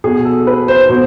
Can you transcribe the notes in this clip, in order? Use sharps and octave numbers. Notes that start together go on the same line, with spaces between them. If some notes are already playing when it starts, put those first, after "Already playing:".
B2 G#4
A4
B4
C5
B2 C5